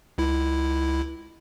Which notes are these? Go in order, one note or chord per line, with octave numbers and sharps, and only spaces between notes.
C#2 E4